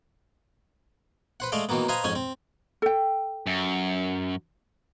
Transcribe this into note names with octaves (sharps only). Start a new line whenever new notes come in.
B4 C5 F#5
G#3 A3 D5 D#5 F5
D#3 E3 F#3 A#3 B3
B4 C5 D#5 F5 G#5 A#5
F2 G#2 C#4 G#5
C4
A4 G5
F#2